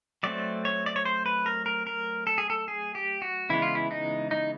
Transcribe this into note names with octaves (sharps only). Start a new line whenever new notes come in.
F#3 A3 C4 D5
C#5
D5
C#5
C5
B4
A#4
A#4
A#4
A4
G#4
A4
G#4
G4
F#4
C#3 E3 G#3 B3 E4
F4
E4
D#4
D#4